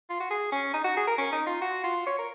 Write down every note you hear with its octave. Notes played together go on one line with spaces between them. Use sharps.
F4
F#4
G#4
C#4
D#4
F#4
G#4
A#4
C#4
D#4
F4
F#4
F4
C#5
A#4